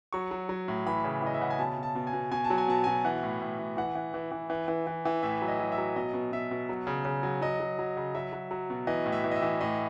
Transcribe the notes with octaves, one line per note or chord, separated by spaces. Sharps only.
F#3 C#6
F#3
F#3
A2
E3 B5
C#3
E3 D#5
E5
C#3 F#5
G#5
B2 A5
B2
A5
B2
G#5
B2
B2 G#5
A5
F#3
G#5
B2 A5
B2 G#5
E3 F#5
A2
A2
A2
E3 F#5
E3
E3
E3
E3
E3
E3
E3
A2 E5
F#3
D#5
F#3
E5
F#3
B2 D#5
B2
B2 E5
B2
F#3
C#3
C#3
F#3
F#3 D#5
F#3
F#3
C#3
F#3 E5
F#3
F#3
B2
E3 D#5
A2
E5
E3
D#5
E5
E3
A2 D#5